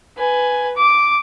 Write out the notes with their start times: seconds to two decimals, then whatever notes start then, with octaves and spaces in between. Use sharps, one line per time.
0.18 B4 G#5
0.77 D6